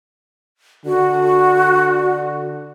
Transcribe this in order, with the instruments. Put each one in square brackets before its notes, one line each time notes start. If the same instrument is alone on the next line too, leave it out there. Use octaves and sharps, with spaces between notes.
[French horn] D3 [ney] F#4